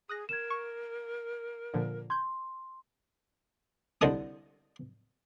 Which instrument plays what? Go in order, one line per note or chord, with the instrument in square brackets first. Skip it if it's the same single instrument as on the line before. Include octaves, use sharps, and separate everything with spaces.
[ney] G#4 [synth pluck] D#6 F#6 A#6
[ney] A#4 [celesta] G#6 E7
[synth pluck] C#6
A#2 D3 F3
[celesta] C6 [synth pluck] G6 G#6
[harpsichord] C2 D3 D#5 A5 D#6